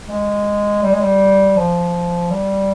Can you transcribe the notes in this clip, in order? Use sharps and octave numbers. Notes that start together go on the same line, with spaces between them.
G#3
G3
G#3
G3
F3
G3